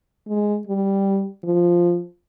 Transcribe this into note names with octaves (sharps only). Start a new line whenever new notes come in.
G#3
G3
F3